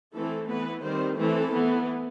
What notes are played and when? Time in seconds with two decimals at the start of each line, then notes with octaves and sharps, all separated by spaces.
0.14 E3 A3 C4 A4
0.48 E3 B3 B4
0.83 D#3 G3 C4 C5
1.17 E3 A3 C4 A4
1.52 E3 B3